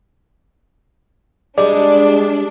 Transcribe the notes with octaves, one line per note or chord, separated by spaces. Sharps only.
G3 G#3 D4 D5